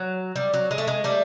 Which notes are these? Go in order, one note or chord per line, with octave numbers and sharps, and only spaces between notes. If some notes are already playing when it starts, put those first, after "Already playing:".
Already playing: F#3
G3
F#3
G#3
A3
G#3
G3 A3